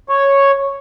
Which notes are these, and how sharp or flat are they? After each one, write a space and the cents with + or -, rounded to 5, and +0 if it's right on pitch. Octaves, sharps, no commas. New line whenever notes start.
C#5 -5